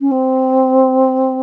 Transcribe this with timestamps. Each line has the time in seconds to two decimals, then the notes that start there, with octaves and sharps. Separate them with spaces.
0.01 C#4
0.11 C4